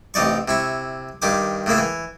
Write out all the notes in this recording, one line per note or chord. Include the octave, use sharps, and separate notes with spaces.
A1 C3 D#4 D5 C#6
C3 E4 C#6
G2 D#3 G4 D6
A2 C#3 A#3 E4
E3